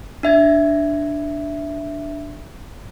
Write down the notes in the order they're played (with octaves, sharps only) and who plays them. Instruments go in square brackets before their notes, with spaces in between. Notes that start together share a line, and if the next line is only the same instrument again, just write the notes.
[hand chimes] D4 E5 G#6